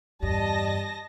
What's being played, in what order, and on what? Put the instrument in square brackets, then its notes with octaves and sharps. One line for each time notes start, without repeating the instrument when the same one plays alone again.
[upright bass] E2 G2 [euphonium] G3 [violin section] D#5 A5 A#6